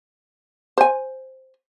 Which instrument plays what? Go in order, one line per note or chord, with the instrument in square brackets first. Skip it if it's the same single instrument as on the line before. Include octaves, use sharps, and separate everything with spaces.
[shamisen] C5 G#5